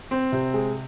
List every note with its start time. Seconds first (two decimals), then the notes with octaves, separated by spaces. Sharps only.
0.11 C4
0.32 C3
0.54 G#3